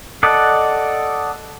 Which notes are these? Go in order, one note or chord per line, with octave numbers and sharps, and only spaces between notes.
A4 D5 D#5 F#5 A5